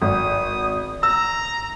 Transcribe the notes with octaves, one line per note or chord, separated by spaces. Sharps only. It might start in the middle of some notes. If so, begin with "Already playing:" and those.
G#1 D#6
A#5 E6